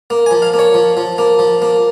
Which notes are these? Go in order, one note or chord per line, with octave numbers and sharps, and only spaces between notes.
A#3
G#5
F3
F5
A#3
C#5
F3
F3
A#3
F3
A#3